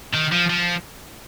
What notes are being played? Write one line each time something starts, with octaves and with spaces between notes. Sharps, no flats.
D#3
F3
F3